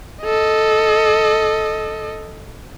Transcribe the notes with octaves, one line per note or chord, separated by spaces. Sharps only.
A4 D#5